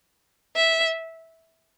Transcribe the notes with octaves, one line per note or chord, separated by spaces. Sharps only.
E5